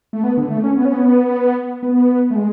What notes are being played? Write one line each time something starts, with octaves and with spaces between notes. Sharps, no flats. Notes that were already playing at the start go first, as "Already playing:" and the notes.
A3
B3
D3
A3
C#4
B3
C#4
B3
B3
A3
G#3